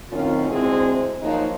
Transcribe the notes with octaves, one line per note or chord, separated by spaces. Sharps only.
F#2 A2 D#3 C4 C#4 F4
D2 G#3 C4 E4 G#4 C5
F3 F#3 A#3 D#4